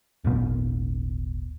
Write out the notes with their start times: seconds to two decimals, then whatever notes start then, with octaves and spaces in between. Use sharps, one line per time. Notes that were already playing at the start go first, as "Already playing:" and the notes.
0.24 D#1 G#1 A#2 B3